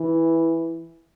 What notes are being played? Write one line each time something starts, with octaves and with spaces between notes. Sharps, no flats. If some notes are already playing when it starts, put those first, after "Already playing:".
Already playing: E3